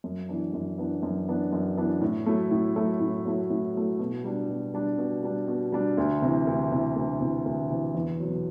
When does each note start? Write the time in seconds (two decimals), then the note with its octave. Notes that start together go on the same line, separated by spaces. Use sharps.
0.04 F#2
0.29 E3 B3 D4
0.54 F#2
0.78 E3 B3 D4
1.03 F#2
1.28 E3 B3 D4
1.53 F#2
1.77 E3 B3 D4
2.02 A2
2.26 F#3 A3 E4
2.51 A2
2.75 F#3 A3 E4
3.00 A2
3.25 F#3 A3 E4
3.50 A2
3.74 F#3 A3 E4
3.99 B2
4.24 G3 D4
4.49 B2
4.74 G3 D4
4.98 B2
5.23 G3 D4
5.48 B2
5.72 G3 D4
5.97 D2
6.22 C3 E3
6.47 D2
6.71 C3 E3
6.96 D2
7.21 C3 E3
7.46 D2
7.70 C3 E3
7.95 E2
8.20 B2 F#3